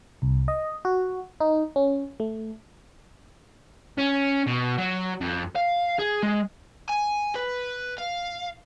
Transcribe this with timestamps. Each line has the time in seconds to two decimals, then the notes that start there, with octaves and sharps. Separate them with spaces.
0.22 C2
0.48 D#5
0.85 F#4
1.40 D#4
1.76 C#4
2.20 A3
3.98 C#4
4.47 B2
4.78 F#3
5.21 F2
5.56 F5
5.99 G#4
6.23 G#3
6.90 G#5
7.36 B4
7.98 F5